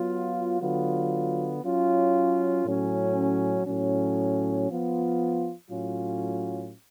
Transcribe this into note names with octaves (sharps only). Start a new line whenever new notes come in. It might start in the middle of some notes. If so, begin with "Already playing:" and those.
Already playing: F#3 B3 F4
D3 F#3 B3 F4
F#3 C#4 F4
A2 F#3 C#4
A2 F#3 C#4
F3 B3 F4
A2 F#3 C#4 F4